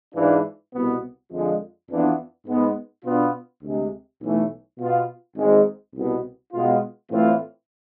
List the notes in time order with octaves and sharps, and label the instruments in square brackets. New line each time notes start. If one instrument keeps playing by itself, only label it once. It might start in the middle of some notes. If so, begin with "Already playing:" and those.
[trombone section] G#2 E3 G#3 D4 F4
C2 B2 B3
F2 D3 F3 G#3
F2 E3 B3 D4 F4
G#2 G#3 B3
B2 B3 D4 F4
D2 C3 G#3
B1 A2 E3 A3
B2 B3 F4
G#1 G#2 G#3
C2 B2 B3
B2 G#3 B3 F4
A2 E3 A3 C4 F4